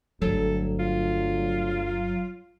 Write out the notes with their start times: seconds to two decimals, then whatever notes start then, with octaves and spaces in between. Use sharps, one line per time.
0.22 G1 D2 F#3 G3 A4
0.79 F4